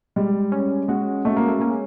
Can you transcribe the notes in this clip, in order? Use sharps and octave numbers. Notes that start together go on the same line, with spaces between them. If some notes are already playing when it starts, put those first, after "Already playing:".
G3 G#3
C#4
G#3 F#4
G#3 A3
A#3
A3
A#3 C#4